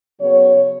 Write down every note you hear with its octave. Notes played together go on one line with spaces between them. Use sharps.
C#3 F#3 B3 C#5